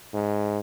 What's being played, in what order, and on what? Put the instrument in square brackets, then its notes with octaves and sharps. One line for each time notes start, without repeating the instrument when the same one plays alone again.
[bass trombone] G#2